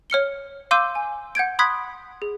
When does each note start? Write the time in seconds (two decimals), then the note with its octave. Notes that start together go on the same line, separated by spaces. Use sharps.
0.10 C#5 F6 C#7 G7
0.71 F5 C6 D6 E6 G6 D#7
0.95 G#5
1.35 F#5 G6 G#6 D7
1.59 B5 C6 D#6 F#6 G#6 B6
2.22 G#4